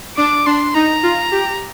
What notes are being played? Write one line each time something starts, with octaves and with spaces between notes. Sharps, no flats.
D4 D6
D4 C6
D#4 A#5
F4
G4